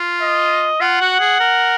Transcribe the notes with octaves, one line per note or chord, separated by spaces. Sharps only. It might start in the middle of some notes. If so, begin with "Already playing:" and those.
Already playing: F4
D#5
F4 F#5
F#4
G#4
A#4